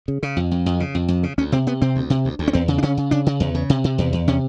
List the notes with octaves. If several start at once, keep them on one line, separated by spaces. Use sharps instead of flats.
C#3
C#3
F2
F2
F2
C#3
F2
F2
C#3
D2 C#4
C3 C4
C3 B3
C3 C4
D2
C3
D2
D2
C#4
E2 C4
C#3
D4
C#3 C#4
C#3
C#3 D4
C#3
E2
C#3
C3
C3
E2
E2
C3 C#4